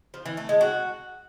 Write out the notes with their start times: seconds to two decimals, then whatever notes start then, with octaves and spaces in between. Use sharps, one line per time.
0.14 F3
0.26 E3
0.37 A3
0.49 G#3
0.61 F#4